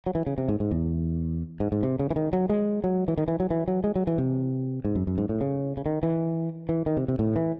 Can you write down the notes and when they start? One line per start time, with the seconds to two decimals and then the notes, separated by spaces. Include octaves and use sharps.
0.06 F#3
0.15 E3
0.27 C#3
0.38 C3
0.49 G#2
0.60 G#2
0.71 E2
1.60 G#2
1.72 G#2
1.83 C3
1.99 C#3
2.10 E3
2.16 D#3
2.33 F#3
2.49 G#3
2.84 F#3
3.08 E3
3.18 D#3
3.28 E3
3.40 F#3
3.50 E3
3.68 F#3
3.84 G#3
3.96 F#3
4.07 E3
4.18 C3
4.85 G#2
4.95 F#2
5.07 F#2
5.18 G#2
5.29 A2
5.41 C#3
5.77 C#3
5.86 D#3
6.03 E3
6.69 E3
6.86 D#3
6.97 C3
7.08 C3
7.19 A2
7.36 E3